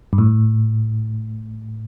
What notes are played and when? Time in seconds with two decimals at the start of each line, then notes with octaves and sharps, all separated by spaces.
0.13 G2
0.18 A2